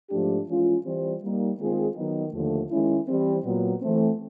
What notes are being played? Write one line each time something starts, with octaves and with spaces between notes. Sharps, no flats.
G#2 F3 A3 D4 G4
E3 G#3 C#4 F4
E3 G3 C4
G3 A#3 D#4
D#3 G#3 C4 F4 G#4
D#3 F#3 B3 D#4
D#2 D3 F3 A3
D#3 G#3 C#4 E4
E3 G3 C4
A#2 F#3 B3
E3 A3 C4